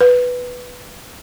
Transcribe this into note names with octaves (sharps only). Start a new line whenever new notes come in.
B4